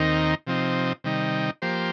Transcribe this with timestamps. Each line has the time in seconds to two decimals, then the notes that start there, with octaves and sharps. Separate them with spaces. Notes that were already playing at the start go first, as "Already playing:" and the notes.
Already playing: D#2 D#3 C4 D#4 A#4
0.47 C3 F3 C4 D#4
1.04 C3 D#3 G3 D#4
1.62 F3 A#3 G4 C5